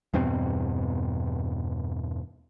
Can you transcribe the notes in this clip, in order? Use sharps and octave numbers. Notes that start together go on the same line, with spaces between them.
E2 G2 B2 C4